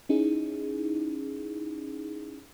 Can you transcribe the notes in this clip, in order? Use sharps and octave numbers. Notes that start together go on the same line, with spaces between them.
C#4 D#4 E4 G#4